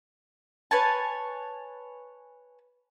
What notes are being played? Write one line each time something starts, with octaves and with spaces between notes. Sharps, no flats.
B4 C#5 G#5 A5